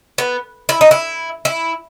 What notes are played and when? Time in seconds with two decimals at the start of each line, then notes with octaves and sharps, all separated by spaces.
0.18 B3
0.69 E4
0.81 D#4
0.91 E4
1.45 E4